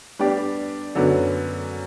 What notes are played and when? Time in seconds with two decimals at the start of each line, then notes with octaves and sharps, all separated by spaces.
0.19 G3 B3 D4 G4 D5
0.95 F#2 D3 F#3 B3